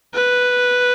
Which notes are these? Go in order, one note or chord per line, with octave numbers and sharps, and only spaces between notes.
B4